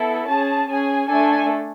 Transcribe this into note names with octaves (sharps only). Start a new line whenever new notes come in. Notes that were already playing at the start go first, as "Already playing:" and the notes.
Already playing: B3 E4 A4
C#4 G#4 A5
C#4 G#4 G#5
A3 D4 A4 G#5